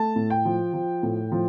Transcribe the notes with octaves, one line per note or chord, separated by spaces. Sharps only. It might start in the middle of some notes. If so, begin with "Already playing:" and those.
Already playing: A3 A5
A2
G5
F3
F3
A2
F3